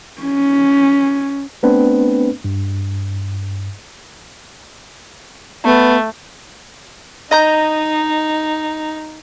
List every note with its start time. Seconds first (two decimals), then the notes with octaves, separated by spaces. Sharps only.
0.21 C#4
1.63 A3 B3 C4 D4 B4
2.44 G2
5.65 A3 B3
7.31 D#4 D#5 A#5 G6